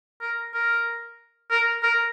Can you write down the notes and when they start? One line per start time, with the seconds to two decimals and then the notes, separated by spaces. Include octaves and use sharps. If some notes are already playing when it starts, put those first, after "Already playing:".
0.21 A#4
0.54 A#4
1.51 A#4
1.83 A#4